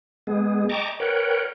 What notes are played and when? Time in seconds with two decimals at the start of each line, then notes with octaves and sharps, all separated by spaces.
0.27 G#3 B3 G#4
0.69 D#5 G5 A5 A#5 C#6 D6
1.00 A#4 B4 C#5 F#5 G5